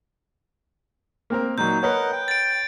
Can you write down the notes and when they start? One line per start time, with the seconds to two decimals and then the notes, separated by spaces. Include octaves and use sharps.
1.30 A#3 C4 A#4
1.58 A#2 F#3 D#4 G6
1.83 A#4 B4 C#5 D#5 F#5
2.12 G5
2.28 A6 D7